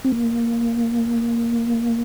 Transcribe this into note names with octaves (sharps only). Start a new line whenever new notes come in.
C4
A#3